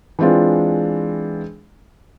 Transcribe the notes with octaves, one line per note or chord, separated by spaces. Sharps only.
E3 G#3 C4 D4 F4